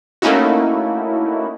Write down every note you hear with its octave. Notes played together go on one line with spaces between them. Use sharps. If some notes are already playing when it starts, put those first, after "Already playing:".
A3 A#3 C#4 D#4 E4 F#4